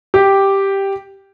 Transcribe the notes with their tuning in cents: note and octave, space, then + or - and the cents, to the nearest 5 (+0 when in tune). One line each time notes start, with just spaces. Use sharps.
G4 +0 G5 +0